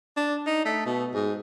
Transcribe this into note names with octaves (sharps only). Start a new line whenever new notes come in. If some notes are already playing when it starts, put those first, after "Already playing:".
D4
D#4
A3
B2
G#2